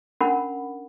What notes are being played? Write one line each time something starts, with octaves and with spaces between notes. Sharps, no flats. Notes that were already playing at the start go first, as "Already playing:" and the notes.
C#4 D4 A#4 F#5 B5